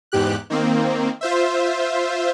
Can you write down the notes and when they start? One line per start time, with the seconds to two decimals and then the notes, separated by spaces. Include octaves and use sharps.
0.12 E2 G#2 G4 F#6
0.50 D#3 A#3 C4
1.21 F4 C5 E5